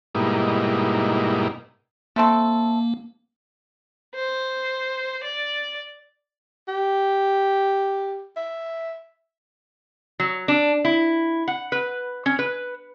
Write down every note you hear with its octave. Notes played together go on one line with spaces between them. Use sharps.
G#2 B2 G3 A#3 D#4 E4
A3 A#3 C4 A4
C5
D5
G4
E5
F#3
D4
E4
F#5
B4
C#4
B4